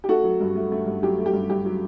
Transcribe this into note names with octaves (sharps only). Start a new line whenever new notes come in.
G4
A3 F#4 A4
F#3
G2
A3
A3
G2
F#3 G4
A3
G4
G2
G2 G4
F#3